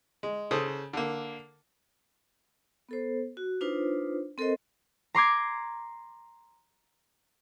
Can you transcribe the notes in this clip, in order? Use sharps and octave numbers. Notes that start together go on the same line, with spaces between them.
G#3
C#3 A4 C5 D#6
D3 A#3
B3 A4 C5
F#4
D4 D#4 F4 B4 C5
C4 A4 A#4 C5 D#5
A#5 C6 D6 G#6